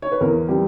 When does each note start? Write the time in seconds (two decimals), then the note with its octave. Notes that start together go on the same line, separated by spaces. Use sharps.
0.02 C#5
0.12 B4
0.21 E2 A#4
0.49 G3 G4